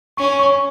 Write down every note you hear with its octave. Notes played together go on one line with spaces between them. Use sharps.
C#4 C#6
C#6